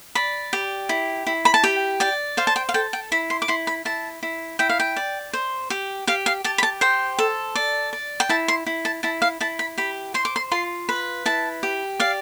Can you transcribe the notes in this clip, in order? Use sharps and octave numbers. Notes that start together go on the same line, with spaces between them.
D5 B5
G4
E4
E4
B5
A5
G4 G5
D5 G5
C5 F5
A5
G5
F5
A4 G5
G5
E4 B5
C6
D6
E4 C6
B5
E4 A5
E4
E4 G5
F5
G5
D5
C5
G4
G4 F5
F5
G4 A5
B5
A5
C5 G5
A4
D5
D5
G5
E4 A5
C6
E4
A5
E4 A5
F5
E4 A5
B5
G4 B5
C5 C6
D6
C6
F4 C6
B4 B5
E4 A5
G4
D5 F5